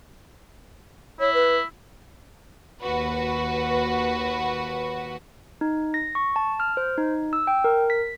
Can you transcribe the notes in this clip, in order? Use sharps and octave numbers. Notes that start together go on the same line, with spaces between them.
E4 C#5
B4
D#2 F#4 B4
D#4
A#6
C#6
A5
F6
C5
D#4
E6
G5
A#4
B6